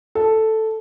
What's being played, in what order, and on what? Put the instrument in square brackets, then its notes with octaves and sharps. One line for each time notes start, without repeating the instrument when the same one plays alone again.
[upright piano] A4